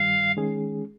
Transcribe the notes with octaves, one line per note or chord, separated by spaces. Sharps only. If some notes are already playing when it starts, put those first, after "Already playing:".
Already playing: G2 D#3 G3 F5
D#3 G#3 C#4 G#4